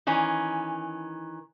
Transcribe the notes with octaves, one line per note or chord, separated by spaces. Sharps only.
D#3 E3 C#4